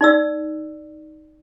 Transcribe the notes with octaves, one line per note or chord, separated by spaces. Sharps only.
D#4 D5 E6